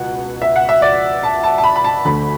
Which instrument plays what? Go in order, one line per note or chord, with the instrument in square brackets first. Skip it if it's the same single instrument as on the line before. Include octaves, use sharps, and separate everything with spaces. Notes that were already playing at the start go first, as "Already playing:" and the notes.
Already playing: [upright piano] C#2 B2 F#5
E5
F#5
E5
D5
A5
A5
A5
B5
B5
A5
D2 D3 A3 B5